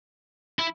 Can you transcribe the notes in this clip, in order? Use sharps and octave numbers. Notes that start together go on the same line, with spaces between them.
E4